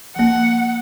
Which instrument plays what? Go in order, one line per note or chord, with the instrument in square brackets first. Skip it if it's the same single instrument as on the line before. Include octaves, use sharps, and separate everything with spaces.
[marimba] F3 A#3 [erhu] F#5